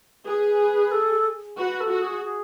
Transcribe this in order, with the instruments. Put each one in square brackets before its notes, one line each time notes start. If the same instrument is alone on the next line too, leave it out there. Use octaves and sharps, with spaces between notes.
[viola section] G#4 [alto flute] B4
[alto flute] A4
[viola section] F#4 [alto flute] B4
[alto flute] A4
[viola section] F#4
[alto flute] G#4
G#4